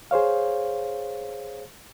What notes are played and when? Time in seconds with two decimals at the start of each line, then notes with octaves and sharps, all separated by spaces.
0.11 G#4 C5 C#5 F5